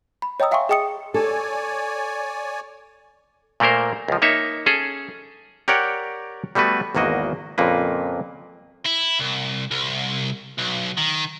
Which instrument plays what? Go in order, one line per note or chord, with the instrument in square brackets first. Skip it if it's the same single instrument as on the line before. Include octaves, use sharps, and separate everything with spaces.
[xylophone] B5
C#5 D#5 G5 A#5 D#6 E6
E5 F5 G5 G#5 C6 C#6
G#4 D#5 G5 D#6 C#7
[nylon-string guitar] A4 [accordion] C#5 D5 G#5
[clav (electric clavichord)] A#2 A3 A#3 A#4 C5
C#2 F3
A#3 D#4 C#5 E5
C#4 G#4 A4
G4 A#4 C#5 D5 F#5 G5
G3 A3 B3 F#4 B4
G#1 E2 A#3 F#4 D#5
F2 A#2 C#3 A#3 B4
[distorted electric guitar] E4
C2
C2
B1
D#3